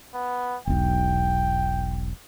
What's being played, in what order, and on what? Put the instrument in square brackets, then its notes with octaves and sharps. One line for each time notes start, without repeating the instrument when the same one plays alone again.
[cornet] B3
[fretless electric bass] E1 B1 [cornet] G5